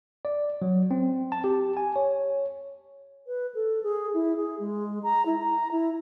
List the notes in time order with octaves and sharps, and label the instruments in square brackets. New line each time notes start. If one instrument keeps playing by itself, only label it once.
[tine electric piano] D5
F#3
C4
A5
G4
G#5
C#5
[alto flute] B4
A4
G#4
E4
G#4
G#3
A#5
E4
A#5
E4